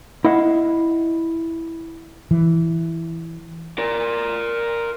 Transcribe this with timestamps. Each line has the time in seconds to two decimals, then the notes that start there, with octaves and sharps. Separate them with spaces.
0.25 E4 D#5 F5 F#5
2.31 E3
3.79 A#4 D5